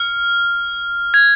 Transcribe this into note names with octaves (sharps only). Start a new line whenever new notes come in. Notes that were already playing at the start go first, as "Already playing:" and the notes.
Already playing: F6
G#6